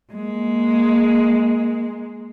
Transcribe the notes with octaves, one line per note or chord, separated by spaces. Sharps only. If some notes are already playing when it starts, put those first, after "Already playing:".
G#3 A#3